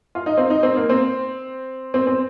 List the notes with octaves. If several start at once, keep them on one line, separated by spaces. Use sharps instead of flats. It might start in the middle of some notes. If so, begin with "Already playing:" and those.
F4
D#4
C4
D#4
C4
A#3
C4
C4
C4